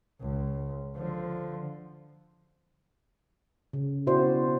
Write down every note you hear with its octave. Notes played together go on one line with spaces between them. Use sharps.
C#2
D3 F3
C#3
B2 E4 F#4 C5 D5